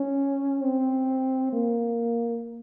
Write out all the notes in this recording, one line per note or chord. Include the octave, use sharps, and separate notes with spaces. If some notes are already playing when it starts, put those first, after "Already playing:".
Already playing: C#4
C4
A#3